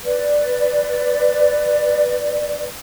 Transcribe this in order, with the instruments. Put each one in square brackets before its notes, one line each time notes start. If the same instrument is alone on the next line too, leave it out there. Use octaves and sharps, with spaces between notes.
[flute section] B4 D5